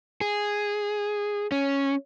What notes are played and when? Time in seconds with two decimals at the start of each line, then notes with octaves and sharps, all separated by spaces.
0.21 G#4
1.52 C#4